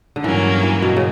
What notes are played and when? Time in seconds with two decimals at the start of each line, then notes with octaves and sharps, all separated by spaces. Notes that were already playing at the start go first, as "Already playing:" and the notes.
0.16 D3
0.24 G2 E3 F#3 A#3 C#4
0.63 E3
0.82 B2
0.96 C#3